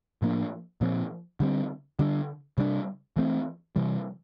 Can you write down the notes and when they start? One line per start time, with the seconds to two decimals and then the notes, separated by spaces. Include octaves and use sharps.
0.22 A2 F3 A#3 D4
0.81 A#2 F3 C4
1.40 D3 G3 C4
1.99 D3 G3 D4
2.58 C3 G3 D4
3.16 E3 A3 C4
3.76 C3 E3 G3